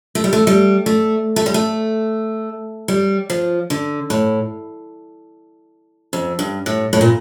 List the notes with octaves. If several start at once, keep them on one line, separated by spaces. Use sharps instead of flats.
A3
G3
A3
G3
A3
A3
G3
A3
G3
F3
D3
A2
F2
G2
A2
A2
A#2